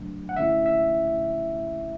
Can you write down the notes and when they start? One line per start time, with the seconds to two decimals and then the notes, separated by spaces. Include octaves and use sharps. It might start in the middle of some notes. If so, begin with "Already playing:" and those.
Already playing: C#3 F#3 A3 D4
0.29 F#5
0.36 D3 A3 C#4 E4 E5
0.66 E5